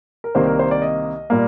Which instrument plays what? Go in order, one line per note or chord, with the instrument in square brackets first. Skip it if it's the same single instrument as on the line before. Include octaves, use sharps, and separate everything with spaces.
[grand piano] A#4
C2 C3 D#3 A#3 C5
A#4
C5
D5
D#5
A#2 G3 A#3